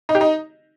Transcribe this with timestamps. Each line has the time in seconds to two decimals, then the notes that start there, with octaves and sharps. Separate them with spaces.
0.09 D#4
0.15 G4
0.21 D#4